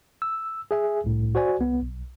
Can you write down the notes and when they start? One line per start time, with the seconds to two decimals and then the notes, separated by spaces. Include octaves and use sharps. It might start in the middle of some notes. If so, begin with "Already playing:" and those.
0.22 E6
0.71 G#4 E5 G#5
1.04 C2 A2
1.35 F#4 C5 D5 G#5
1.60 C2 B3
1.82 B1